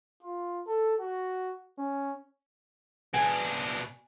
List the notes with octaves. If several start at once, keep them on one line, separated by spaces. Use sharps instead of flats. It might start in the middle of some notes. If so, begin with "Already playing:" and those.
F4
A4
F#4
C#4
B2 D4 G#5